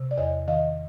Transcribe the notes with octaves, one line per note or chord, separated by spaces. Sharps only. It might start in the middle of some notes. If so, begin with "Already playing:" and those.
Already playing: C3
D5
E2 C#5 D#5
D#3 D#5 F5